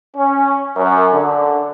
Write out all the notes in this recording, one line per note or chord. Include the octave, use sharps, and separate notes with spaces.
C#4
F#2
D3